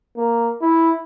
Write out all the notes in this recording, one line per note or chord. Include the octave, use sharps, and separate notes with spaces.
A#3
E4